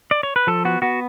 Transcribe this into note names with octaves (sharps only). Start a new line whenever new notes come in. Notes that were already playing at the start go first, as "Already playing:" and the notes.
D5
C#5
B4
F3 A4
B3 F#4
B3 F#4